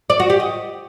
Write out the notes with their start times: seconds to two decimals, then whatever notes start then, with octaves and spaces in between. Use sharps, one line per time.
0.10 D5
0.20 F#4
0.30 G4
0.40 D#5